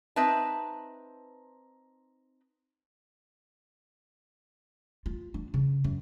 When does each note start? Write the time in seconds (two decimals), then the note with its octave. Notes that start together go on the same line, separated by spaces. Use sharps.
0.16 C4 D#4 B4 E5 A5
5.06 F4
5.34 D4
5.54 C#3
5.84 F#2